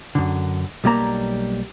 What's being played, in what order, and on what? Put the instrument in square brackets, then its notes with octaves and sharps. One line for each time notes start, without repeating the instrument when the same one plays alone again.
[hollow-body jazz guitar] F#2 D3
B1 G3 A#3 A#5